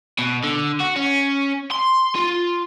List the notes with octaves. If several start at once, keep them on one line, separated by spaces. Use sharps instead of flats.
B2
D3
F#4
C#4
C6
F4